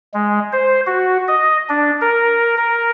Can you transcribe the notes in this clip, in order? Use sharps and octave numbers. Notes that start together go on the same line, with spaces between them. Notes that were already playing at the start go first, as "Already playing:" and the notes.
G#3
C5
F#4
D#5
D4
A#4
A#4